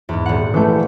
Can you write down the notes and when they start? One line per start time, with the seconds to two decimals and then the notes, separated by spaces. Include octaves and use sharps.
0.09 E2 G#2
0.26 D#1 F#5
0.54 A#1 E3 A3 G6